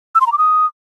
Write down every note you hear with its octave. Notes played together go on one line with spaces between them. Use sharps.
E6
C6
A#5
D6
D#6